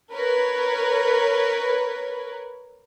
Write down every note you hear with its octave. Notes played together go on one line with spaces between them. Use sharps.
A#4 B4 C#5